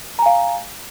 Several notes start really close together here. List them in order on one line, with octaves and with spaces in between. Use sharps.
A#5 G#5 F5